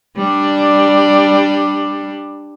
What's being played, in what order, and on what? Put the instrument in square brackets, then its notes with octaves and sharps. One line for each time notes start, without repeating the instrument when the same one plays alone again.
[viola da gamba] G3 D4